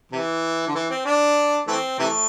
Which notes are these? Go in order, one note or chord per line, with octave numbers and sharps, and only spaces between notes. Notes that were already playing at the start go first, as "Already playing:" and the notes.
C3 E3
D3
E3
C4
D4
E3 A3 C4
C3 E3 A3